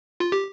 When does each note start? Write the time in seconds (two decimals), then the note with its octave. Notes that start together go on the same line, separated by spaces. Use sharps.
0.20 F4
0.32 G4